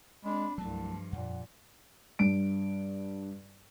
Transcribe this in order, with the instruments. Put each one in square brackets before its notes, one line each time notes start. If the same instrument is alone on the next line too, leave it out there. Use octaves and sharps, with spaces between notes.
[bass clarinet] G#3 [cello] C4 D4 [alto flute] B5
[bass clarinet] C2 [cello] G2 F3 [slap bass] F#3 A3 [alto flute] A5
[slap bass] F2 [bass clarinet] A#2 [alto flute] F#5
[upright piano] G2 D7